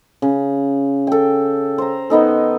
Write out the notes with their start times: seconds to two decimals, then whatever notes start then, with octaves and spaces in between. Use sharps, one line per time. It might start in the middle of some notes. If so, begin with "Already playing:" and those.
0.22 C#3
1.07 A4 G5
1.78 C5 A#5
2.10 D#3 B3 D#4 A4